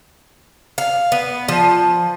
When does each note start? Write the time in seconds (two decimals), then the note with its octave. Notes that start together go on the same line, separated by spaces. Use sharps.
0.78 F5
1.12 B3
1.48 F3